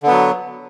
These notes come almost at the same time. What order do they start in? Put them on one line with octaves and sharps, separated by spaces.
D3 B3 F#3